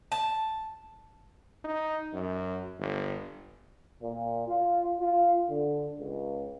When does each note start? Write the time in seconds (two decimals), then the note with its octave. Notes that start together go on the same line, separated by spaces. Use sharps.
0.12 A5
1.64 D#4
2.13 F#2
2.79 G1
4.02 A#2
4.47 F4
5.00 F4
5.48 D3
6.00 C#2